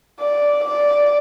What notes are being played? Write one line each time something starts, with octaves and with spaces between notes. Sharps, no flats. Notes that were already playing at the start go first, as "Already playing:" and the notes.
D5
D5